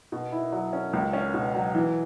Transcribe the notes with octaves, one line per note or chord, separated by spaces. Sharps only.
B2
E4
F#3
C#4
C#2
C#4
B2
F#3
E3